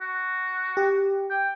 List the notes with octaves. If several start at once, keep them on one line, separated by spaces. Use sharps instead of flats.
F#4
G4
G5